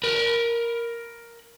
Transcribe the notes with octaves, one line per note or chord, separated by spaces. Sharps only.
A#4 B5